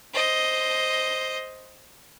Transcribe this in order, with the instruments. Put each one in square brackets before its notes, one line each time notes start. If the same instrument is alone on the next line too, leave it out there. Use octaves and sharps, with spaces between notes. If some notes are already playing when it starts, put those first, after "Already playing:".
[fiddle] C5 D#5